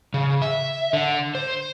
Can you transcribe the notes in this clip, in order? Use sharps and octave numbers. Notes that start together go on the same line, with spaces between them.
C#3
E5
D3
C5